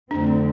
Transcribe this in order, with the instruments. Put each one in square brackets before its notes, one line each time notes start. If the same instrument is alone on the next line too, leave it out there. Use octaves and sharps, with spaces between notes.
[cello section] F2 D3 A3 C4 [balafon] D4